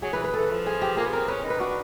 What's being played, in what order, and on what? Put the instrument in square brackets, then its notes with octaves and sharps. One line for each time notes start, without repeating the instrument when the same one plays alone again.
[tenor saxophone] F#3 [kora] G#4
[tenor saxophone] E3 [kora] B4
[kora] B4
[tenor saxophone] E3 [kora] A4
[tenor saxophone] F3
[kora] G#4
G4
[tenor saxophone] A#3 [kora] G#4
[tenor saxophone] B3
[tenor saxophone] C4 [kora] A#4
[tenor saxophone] C#4 [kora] B4
[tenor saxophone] D#4
[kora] B4
[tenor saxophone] D4 [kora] F#4